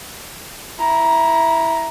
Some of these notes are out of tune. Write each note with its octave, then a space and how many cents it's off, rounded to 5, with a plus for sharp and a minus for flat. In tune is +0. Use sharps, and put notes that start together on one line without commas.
E4 +0 A#5 +15